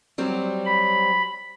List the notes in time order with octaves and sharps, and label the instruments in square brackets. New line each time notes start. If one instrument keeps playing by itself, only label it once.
[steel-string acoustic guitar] F#3 G3 C4
[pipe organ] B5